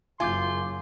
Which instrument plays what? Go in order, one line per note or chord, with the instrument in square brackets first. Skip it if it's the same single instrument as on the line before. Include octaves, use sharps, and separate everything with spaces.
[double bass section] F#1 F#2 [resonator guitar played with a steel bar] F4 [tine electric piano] G#5 D6 G6 [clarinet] C6